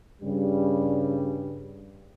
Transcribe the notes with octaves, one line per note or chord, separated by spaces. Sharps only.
G2 C#3 G3